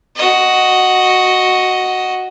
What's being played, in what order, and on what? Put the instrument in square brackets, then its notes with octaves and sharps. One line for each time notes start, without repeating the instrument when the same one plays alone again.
[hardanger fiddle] F#4 D#5